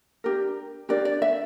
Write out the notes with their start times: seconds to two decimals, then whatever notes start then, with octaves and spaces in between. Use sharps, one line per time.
0.24 D4 G4 A#4
0.89 D4 G4 A#4 D5
1.05 D5
1.22 E5